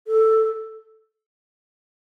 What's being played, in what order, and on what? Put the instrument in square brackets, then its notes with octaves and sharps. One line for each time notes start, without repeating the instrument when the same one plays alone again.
[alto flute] A4